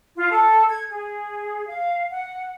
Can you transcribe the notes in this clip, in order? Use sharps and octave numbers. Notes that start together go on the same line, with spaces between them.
F4
A4
G#6
G#4
F5
F#5